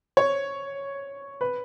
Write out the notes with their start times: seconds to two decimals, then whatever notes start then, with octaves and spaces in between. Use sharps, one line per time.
0.17 C#5
1.41 B4